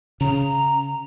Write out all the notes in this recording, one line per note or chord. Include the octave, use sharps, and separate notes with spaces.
C#3 A#5